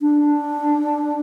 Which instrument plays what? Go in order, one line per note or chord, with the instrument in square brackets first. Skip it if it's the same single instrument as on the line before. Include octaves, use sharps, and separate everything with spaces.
[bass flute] D4